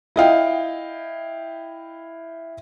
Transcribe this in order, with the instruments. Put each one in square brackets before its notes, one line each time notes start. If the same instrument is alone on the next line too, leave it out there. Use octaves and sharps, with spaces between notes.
[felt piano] E4 D#5 F5 G5